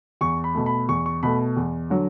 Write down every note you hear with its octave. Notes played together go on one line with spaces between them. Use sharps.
E2 C#6
B5
B2 A3
B5
E2 C#6
C#6
B2 A3 B5
E2
D3 F#3